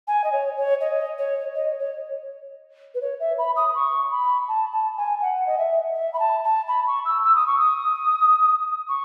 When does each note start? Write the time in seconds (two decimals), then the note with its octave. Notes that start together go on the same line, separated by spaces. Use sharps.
0.07 G#5
0.24 D#5
0.32 C#5
0.57 C#5
0.81 D#5
1.18 C#5
1.55 D#5
1.79 C#5
2.95 B4
3.01 C#5
3.20 E5
3.38 B5
3.56 D#6
3.75 C#6
4.11 B5
4.48 A5
4.73 A5
4.97 G#5
5.22 F#5
5.46 D#5
5.58 E5
5.95 E5
6.14 B5
6.19 A5
6.44 A5
6.68 B5
6.87 C#6
7.05 E6
7.24 E6
7.35 D#6
7.47 C#6
7.59 D#6
8.89 C#6